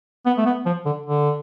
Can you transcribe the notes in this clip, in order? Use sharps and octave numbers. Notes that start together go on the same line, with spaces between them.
B3
A3
B3
F3
D3
D3